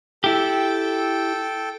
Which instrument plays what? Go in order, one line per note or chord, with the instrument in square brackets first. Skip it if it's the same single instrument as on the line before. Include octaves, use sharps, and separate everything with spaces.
[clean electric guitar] E4 G4 [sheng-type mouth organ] A4 G5